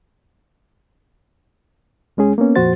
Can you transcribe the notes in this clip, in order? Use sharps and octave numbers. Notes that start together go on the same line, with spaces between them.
C2 G#3 C#4 G#4
A#3 B3 C#4
F2 A#2 F3 F#4 C5 A6